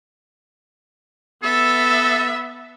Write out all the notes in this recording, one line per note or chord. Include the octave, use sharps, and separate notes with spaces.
B3 A4 E5